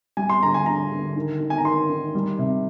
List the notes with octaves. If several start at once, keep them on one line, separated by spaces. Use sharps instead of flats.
G3 G#5
C6
D3 A#5
G#5
D3 A#5
D3
D#3
D#3
G#5
A#5
D#3 C6
D#3
G3
C3